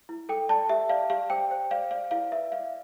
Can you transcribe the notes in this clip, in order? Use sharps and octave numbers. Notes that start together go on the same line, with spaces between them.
E4
A4 G5
D5 A5
G4 E5
D5 F5
G4 F5
C5 G5
C5
D5 F5
D5 F5
E4 F5
B4 E5
D5 F5